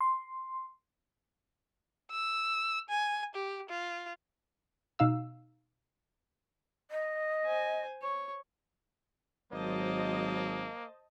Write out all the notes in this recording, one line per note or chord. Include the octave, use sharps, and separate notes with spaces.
C6
E6
G#5
G4
F4
B2 D#4 F5 E6
D#5
C5 G#5
C#5
G#1 F#3 A#3 C5 D#5 A5